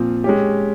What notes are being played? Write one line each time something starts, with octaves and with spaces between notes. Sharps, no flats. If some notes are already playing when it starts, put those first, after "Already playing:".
Already playing: A#2 F3 C4
G#3 C#4 G4